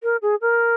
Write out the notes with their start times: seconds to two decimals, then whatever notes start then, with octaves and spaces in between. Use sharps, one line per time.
0.03 A#4
0.22 G#4
0.41 A#4